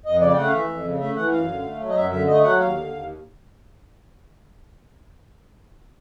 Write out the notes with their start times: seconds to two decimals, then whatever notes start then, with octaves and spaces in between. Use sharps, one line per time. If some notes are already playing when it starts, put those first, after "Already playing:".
0.05 F2 D#5
0.21 C#3 D5
0.32 G5
0.37 A3 F#5
0.47 F5
0.53 E3 E5
0.69 F2
0.84 C#3
1.00 A3 E5
1.16 E3 F#5
1.32 F#2 F5
1.48 D3
1.64 A3
1.80 F#3
1.89 D#5
1.96 F#2 E5
2.12 D3 E5
2.27 A3 D#5
2.43 F#3 F#5
2.59 D#2 F5
2.75 D3
2.91 D#2